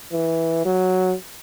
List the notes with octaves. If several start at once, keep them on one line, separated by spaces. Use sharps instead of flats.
E3
F#3